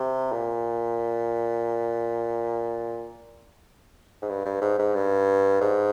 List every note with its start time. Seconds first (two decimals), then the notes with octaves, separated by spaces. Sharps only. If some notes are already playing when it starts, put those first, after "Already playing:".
Already playing: C3
0.32 A#2
4.22 G#2
4.29 G2
4.45 G2
4.61 G#2
4.79 G#2
4.95 G2
5.61 G#2